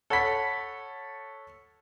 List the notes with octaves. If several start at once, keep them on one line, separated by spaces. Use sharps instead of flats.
A4 C#5 F#5 B5 B6